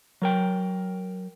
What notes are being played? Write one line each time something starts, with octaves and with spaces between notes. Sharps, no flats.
F#3 A#4 G5